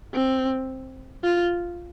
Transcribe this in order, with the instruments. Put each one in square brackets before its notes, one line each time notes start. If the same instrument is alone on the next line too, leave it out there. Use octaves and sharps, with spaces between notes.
[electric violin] C4
F4